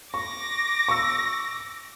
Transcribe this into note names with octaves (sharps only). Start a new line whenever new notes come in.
C#6 D6 A#6
C#6 E6